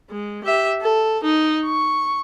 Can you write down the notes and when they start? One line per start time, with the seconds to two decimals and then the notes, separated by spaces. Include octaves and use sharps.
0.11 G#3
0.44 G4 E5
0.81 A4
1.23 D#4
1.65 C#6